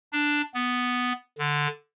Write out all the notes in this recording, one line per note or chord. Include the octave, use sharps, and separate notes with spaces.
D4
B3
D3